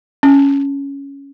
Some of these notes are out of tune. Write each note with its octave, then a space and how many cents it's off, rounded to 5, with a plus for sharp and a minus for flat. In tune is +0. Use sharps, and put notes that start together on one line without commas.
C#4 +5